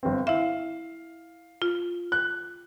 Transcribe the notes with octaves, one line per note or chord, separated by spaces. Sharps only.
G1 C4
E4 E5 F5
F4
F#6